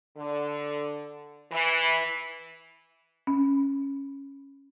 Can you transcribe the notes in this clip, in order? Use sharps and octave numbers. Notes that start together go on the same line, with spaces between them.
D3
E3
C#4